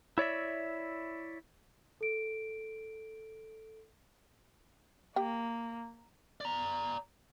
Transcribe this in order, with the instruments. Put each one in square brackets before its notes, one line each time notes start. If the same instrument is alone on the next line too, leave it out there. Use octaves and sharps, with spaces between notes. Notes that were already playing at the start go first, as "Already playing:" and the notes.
[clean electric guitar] E4 C#5 D5 E5
[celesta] A4 D7
[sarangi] A#3 [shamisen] G4 G5
[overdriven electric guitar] D5 A#5